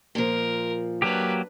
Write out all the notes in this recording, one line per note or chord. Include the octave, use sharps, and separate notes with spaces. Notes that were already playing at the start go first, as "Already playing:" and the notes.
A#2 F3 A#4
F#3 A#3 D4 G4 B4